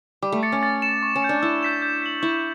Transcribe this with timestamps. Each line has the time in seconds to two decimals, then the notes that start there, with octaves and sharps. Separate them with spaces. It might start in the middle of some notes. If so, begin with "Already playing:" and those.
0.22 G3 D6
0.32 A3
0.43 A6 C#7
0.52 C#4
0.63 A6
0.82 C#7 E7
1.03 C#6
1.16 C#4
1.22 G6 C#7
1.29 D4
1.42 E4 E6
1.63 G6 B6 E7
1.82 G6
2.02 B6 F#7
2.22 E4 C#6